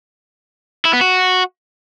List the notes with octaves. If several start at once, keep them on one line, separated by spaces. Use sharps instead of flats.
E4
B3
F#4